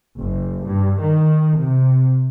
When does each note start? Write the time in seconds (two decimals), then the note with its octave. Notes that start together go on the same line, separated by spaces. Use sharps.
0.17 F#1
0.64 G2
1.02 D#3
1.58 C3